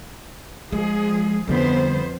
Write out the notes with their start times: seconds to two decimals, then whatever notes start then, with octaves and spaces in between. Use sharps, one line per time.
0.72 F3 G#3 G#4
1.48 F2 D3 G3 B3 C5